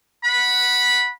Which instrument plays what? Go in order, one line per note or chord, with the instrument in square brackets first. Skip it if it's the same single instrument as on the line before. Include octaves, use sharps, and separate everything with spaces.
[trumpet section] F#5 B5